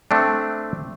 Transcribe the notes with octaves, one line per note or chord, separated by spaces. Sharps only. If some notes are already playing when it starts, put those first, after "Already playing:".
A3 C4 D4